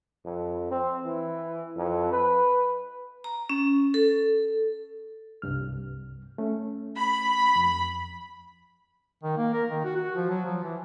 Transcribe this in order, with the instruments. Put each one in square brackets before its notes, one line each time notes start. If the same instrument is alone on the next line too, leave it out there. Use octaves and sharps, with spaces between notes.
[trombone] F2
C4
E3
F2
B4
[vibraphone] A#5
C#4
A4
[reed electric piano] C2 G2 F6
A3 C#4
[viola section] B5
[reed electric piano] F2
[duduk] D#3
A#3
A#4
D#3
F#4
F#4
F3
F#3
F3
E3